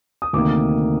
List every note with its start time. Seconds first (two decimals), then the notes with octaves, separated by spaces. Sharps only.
0.22 D#6
0.33 D2 C3 D#3 A#3 D6